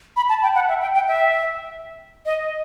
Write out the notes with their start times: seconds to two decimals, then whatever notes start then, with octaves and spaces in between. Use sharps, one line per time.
0.16 B5
0.29 A5
0.42 G5
0.55 F#5
0.68 E5
0.81 G5
0.94 G5
1.07 E5
2.25 D#5